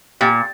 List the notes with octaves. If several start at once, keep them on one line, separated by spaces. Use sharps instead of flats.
A#2 G4